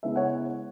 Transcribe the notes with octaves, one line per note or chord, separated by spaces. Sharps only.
C#3 G#3 B3 E4 E5
C#5 F#5